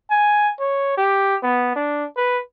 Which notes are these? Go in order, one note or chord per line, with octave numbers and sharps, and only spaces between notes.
G#5
C#5
G4
B3
D4
B4